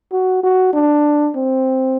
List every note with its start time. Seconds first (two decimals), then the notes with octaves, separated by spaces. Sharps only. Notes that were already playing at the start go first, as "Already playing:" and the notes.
0.12 F#4
0.43 F#4
0.73 D4
1.36 C4